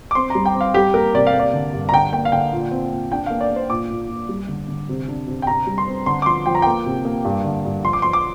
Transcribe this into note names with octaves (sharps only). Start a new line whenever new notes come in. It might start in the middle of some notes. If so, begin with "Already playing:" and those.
D6
C4 C6
G3 A#5
G5
C4
F5
G3 G4
A#3 A#4
C3 D5
F5
A#3
D5
D3
G2
A#5
D3 G5
A#3 G5
F5
D3 G5
A#2
C4
A#2
D4 G5
A#3 F5
D5
A#3
C5
A#2 D6
A#2
A#2
G3
D3
D3
C3
D4
C3
G5
C3 A#5
G3
C6
C4
D3 C6
D6
F3 C6
F3 G5
A#5
A#3 G5
C3
A#3
G2
D3
G2
F3 C6
D6
F3 C6
D6